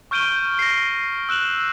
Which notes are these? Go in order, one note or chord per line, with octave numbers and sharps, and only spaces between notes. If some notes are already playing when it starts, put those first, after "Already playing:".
C#6 F6 G6 D7 D#7 G7
A#6 C7
E6 F#6 E7 F#7